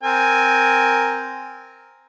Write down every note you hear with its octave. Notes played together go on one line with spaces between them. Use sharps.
C4 A#4 G#5